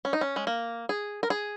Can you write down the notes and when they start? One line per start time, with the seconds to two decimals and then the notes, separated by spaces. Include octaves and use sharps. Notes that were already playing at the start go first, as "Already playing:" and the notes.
0.05 C#4
0.13 D#4
0.21 C#4
0.36 G#3
0.47 A#3
0.89 G#4
1.23 A#4
1.30 G#4